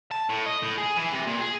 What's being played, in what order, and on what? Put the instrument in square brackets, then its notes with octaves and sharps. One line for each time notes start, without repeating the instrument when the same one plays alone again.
[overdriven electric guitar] A5
A2
D#5
A2
G#4
E3
C3
A#2
G#4